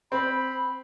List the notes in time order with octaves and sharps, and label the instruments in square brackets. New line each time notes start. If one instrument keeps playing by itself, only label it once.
[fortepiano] C4 [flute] B5